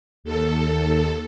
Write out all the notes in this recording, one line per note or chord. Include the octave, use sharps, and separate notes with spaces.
D#2 A4